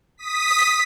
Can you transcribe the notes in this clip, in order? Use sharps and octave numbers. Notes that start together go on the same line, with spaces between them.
D#6 B6